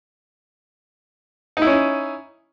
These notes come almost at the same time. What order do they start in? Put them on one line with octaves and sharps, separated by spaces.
D#4 E4 C#4